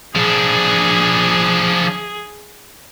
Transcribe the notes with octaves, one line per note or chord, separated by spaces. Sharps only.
F3 D4 G#4